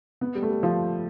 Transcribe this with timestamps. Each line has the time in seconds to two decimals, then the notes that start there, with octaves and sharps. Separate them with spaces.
0.21 B3
0.35 G3
0.42 A3
0.49 G3
0.63 F3